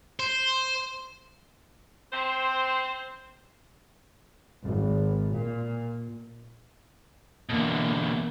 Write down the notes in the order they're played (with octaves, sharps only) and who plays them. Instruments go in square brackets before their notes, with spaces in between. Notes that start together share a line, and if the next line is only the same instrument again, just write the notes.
[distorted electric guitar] C5
[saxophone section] C4 C5
[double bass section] G#1
A#2
[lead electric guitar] B2 D3 [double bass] E3 A#3